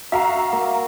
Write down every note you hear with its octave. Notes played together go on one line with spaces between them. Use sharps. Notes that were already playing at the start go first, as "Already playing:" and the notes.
F#4 E5 F5 A#5
A#3